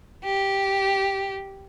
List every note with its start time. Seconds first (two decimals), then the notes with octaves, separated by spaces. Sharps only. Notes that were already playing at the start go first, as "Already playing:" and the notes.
0.24 G4